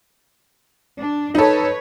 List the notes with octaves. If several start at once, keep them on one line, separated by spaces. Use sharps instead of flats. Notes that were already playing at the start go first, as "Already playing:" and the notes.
D4
D#4 A4 B4 C#5